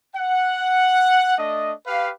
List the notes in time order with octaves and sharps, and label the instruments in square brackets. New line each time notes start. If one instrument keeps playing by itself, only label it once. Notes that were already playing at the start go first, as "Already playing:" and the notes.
[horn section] F#5
A3 D4 D#5
G4 B4 F5